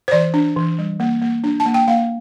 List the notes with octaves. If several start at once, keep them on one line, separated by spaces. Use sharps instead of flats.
C5
E3 D5
D4
E3
G3
A#3
A#3
D4
A5
A#3
G5
A#3 F5